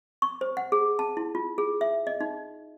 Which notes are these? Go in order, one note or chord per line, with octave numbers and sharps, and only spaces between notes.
C#6
C5
F#5
G#4
A5
E4
F4
G#4
E5
D#5
D#4